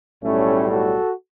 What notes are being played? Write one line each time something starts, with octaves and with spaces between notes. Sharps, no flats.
B1 A2 G3 A3 C#4
F#4 A4